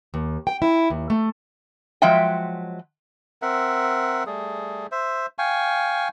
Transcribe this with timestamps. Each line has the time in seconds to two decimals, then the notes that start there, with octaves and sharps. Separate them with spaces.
0.14 D#2
0.47 G5
0.62 E4
0.90 D#2
1.10 A3
2.02 F3 F#3 G#3 E5 G5
3.42 C4 A#4 E5 F#5
4.26 G3 A3 G#4
4.91 C5 E5
5.38 F5 G5 G#5 C#6